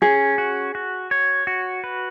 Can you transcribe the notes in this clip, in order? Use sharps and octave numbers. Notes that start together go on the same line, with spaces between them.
C#4 G#4
F#4
F#4
C#5
F#4
B4